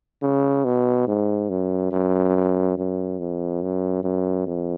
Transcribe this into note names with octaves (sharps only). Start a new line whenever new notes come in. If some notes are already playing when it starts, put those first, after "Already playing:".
C#3
B2
G#2
F#2
F#2
F#2
F2
F#2
F#2
F2